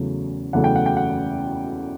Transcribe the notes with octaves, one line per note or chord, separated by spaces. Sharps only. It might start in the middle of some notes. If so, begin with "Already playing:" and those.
Already playing: E2 C#3 F#3 A3
E2 C#3 F#3 A3 F#5
G5
F#5
G5
F#5